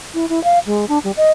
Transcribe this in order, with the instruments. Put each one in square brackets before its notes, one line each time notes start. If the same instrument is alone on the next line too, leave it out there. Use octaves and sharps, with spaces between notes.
[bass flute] E4
E4
F5
G#3
D4
G3
D#5